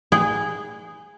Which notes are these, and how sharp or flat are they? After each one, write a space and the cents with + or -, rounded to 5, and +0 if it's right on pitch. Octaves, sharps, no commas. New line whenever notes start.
G#4 -10 G5 -35